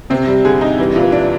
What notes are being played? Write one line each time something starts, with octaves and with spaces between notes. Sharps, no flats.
C3 C4
G3
D3 G#4
D#4
E3 G3
A#2
E3
D4